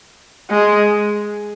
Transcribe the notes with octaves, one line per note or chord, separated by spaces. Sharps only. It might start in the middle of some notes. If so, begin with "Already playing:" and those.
G#3